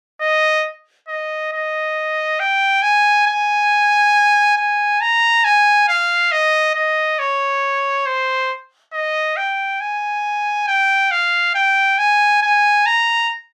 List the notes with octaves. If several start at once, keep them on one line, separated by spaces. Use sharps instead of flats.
D#5
D#5
D#5
G5
G#5
G#5
G#5
A#5
G#5
F5
D#5
D#5
C#5
C5
D#5
G5
G#5
G5
F5
G5
G#5
G#5
A#5